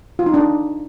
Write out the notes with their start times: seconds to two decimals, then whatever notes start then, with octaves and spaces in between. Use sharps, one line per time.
0.19 F4
0.26 D#4
0.34 D4